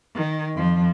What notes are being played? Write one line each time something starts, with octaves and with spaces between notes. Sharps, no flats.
D#3
F2 F3